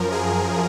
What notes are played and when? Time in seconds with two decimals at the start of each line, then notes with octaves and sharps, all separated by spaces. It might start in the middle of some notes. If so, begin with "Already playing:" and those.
Already playing: F#2 F3 A#4
0.12 G#4